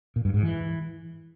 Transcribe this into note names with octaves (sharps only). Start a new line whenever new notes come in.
A#2
G2
G#2
E3